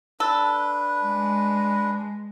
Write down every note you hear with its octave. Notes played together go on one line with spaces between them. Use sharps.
D4 A4 B4
G#3